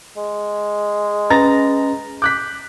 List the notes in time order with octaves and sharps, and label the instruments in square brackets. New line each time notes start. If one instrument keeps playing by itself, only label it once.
[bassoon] G#3
[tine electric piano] C#4 B4 [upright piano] A#5 A6 A#6
[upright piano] D6 F#6 B6 [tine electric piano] G6